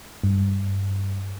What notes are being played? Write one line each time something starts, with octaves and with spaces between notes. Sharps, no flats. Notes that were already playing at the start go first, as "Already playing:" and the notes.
G2